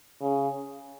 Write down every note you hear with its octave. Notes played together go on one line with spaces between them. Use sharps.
C#3